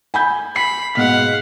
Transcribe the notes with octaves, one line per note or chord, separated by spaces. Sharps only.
G#5 B5 G6
B5 C7
G#2 B2 F5 F#5 B6